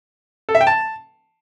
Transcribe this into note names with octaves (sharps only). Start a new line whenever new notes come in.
A4
E5
G5
A5